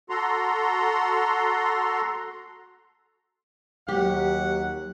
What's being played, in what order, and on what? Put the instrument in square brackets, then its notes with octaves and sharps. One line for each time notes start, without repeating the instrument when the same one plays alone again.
[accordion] F#4 A4 A#5 C6
[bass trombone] D#2 [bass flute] F#3 [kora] G4 [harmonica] F#5